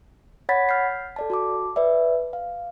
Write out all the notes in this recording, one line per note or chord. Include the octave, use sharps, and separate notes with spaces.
C#5 F#5 B5 G#6 A6 B6
F6 G6 C7
A4 D5 A5
F#4 A5 D6
B4 D5 E5
F5